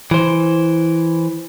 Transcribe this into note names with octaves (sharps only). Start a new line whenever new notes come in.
E3 C5